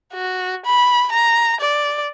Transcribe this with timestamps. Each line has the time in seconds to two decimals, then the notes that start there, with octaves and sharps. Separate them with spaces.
0.13 F#4
0.65 B5
1.12 A#5
1.60 D5